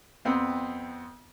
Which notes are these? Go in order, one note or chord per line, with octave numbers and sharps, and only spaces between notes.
F2 B3 C4